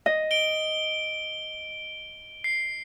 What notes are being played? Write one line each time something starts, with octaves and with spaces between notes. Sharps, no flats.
D#5
D7 G7
C7